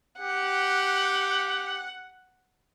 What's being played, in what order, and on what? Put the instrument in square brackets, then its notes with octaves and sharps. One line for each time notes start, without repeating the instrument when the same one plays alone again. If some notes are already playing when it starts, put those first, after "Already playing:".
[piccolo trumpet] G4 [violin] F#5